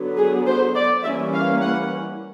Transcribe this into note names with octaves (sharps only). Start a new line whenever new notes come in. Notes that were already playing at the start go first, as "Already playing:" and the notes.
Already playing: D3 F#3 B3
G#4
C5
D5
E3 G3 A#3 C#4 E5
F5
F#5